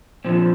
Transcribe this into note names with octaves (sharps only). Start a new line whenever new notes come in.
A#2 F3 C4